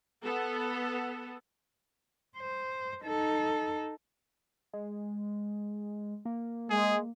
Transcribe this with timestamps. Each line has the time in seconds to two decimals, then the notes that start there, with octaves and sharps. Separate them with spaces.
0.24 B3 A4
2.37 C5
3.05 D#4 A4
4.73 G#3
6.25 A#3
6.70 G#3 G#4